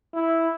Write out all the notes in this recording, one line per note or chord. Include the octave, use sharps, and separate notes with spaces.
E4